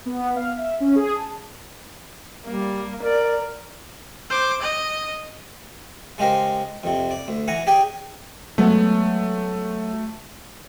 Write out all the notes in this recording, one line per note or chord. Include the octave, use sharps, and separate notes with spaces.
B3
F5
E5
C#4
G#4
A5
G3 A#3
A#4 D5
C5 D6
D#5
C#3 G#3 G4 A#4 C5
F2 C3
D5
D2
E3 F#5 G#5 A#5
G4 G#4 D5 G5 G#5
F#3 G#3 A3 B3